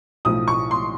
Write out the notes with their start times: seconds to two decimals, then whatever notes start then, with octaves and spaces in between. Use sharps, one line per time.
0.25 B1 A2 F3 A3 D#6
0.48 C#6
0.71 C6